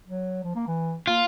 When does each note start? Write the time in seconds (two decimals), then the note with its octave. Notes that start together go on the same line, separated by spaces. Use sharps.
0.07 F#3
0.44 F3
0.55 A#3
0.68 E3
1.07 A#3 F4